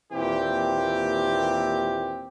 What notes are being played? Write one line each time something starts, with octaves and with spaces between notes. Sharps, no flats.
D#2 A#2 E3 C4 G4